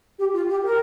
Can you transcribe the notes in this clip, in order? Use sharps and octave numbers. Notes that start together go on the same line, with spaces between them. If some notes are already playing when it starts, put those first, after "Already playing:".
G4
F4
G4
A#4